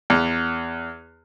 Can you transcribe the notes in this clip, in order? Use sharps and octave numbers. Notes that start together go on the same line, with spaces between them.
E2